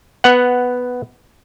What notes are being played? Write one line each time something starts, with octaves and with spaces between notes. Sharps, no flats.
B3 F#5